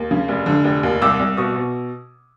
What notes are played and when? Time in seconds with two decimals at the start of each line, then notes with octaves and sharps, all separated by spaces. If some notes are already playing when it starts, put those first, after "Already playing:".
Already playing: D#2
0.11 C#3
0.28 F1
0.46 D3
0.64 F1
0.83 D#2
1.02 C2 D6 E6
1.19 C2
1.37 B2 C#6 D#6
1.56 B2